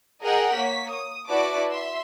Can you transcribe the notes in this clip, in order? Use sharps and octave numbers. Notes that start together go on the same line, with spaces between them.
G#4 A#4 D#5 F#5 G5 A#5
A#3 C#5 B6
D#6
E4 F#4 B4 D5 A5 D6
E5 C6